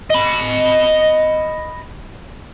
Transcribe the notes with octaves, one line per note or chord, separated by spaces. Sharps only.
D#5 B5